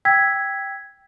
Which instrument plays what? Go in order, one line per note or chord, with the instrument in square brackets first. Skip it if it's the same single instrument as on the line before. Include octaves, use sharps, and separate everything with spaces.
[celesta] G5 E6 G#6 B6